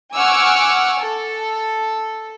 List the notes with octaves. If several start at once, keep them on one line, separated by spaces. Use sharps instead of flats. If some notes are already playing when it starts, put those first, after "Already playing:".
F#5 G#5 C#6 D6 E6 F6
A4